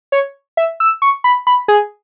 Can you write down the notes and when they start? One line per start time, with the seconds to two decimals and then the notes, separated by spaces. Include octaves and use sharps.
0.12 C#5
0.57 E5
0.80 E6
1.02 C#6
1.24 B5
1.47 B5
1.68 G#4